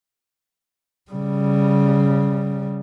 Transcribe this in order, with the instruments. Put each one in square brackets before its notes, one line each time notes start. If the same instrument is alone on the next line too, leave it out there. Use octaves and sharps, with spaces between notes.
[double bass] C#3 G3